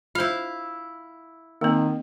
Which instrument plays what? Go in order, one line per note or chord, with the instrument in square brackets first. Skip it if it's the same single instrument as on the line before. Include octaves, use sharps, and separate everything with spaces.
[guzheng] E4 F5 [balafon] F4 C5
[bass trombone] D#3 [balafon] A#3 C4